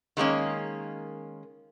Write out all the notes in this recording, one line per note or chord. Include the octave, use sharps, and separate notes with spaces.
D#3 G#3 A#3 C#4